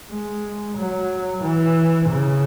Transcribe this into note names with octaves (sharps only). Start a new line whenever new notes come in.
G#3
F#3
E3
C#3